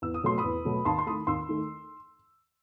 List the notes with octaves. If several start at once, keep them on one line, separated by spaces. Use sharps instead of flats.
E2 E6
D#6
B2 F#3 A3 C6
B5 D#6
E2
B2 F#3 A3
D#2 A5 C6
C6
D#3 A3 B5 D#6
D#2 C6 E6
D#3 A3